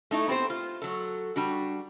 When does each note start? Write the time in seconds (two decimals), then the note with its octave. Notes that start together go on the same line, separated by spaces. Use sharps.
0.11 A3 D#4 E4 A4
0.28 B3 C4 G4 C5
0.50 F4
0.82 F#3 A4
1.36 G3 D4 F#4